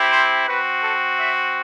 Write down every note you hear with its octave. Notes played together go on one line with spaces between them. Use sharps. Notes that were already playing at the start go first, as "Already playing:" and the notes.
Already playing: C4 E4 G4
C5
C4 F#4 B4
A4
E5